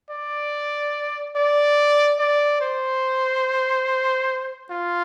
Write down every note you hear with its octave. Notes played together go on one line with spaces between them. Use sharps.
D5
D5
D5
C5
F4